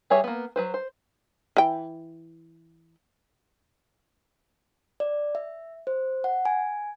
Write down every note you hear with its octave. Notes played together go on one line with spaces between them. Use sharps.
G3 G#4 B4 C#5 E5
A#3 B3
F#3 B4 C5
C5
E3 G5
D5
E5
C5
F#5
G#5